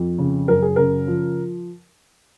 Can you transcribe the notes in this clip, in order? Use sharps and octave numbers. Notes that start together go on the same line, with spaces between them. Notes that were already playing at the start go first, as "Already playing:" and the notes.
Already playing: F2
C#3
F#2 A#4
G#4
C#3 A#4
F3